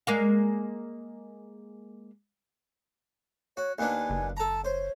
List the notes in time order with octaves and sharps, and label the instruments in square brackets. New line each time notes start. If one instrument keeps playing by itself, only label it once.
[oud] G#3 A#3 F5
[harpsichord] F#4 [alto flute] C#5
[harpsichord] D#2 B3 D4 [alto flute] G#5
[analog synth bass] F#1
[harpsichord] A4 A#5 [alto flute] A5
[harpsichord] C5 [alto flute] C#5